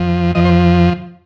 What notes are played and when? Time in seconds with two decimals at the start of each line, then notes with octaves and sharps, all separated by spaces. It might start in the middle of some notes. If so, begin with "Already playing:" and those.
Already playing: F2 F3
0.35 F2 F3 D#5
0.45 C5